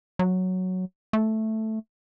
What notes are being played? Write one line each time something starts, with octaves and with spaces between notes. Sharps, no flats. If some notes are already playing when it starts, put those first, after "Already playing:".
F#3
A3